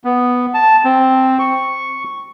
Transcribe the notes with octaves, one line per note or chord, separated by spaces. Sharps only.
B3
A5
C4
C#6